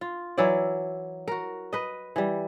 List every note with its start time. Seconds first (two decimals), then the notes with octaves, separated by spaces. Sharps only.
0.01 F4
0.38 E3 F#3 E4 D5
1.28 F#4 A#4
1.73 B4 D#5
2.16 E3 G3